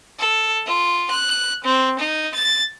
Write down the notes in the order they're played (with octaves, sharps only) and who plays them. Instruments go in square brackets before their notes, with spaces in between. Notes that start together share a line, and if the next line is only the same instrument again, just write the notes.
[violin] A4
F4
F#6
C4
D#4
A6